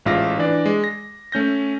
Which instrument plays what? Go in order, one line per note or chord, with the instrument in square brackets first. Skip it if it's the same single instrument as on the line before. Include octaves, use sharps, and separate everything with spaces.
[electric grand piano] A1 G#2 F4 E5 D6 A#6
E3 D4 D5
G#3
A#6
A3 C#4 G6 A#6